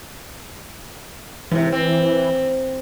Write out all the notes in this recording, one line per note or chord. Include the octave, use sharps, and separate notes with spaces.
G#2 C3 E3
C4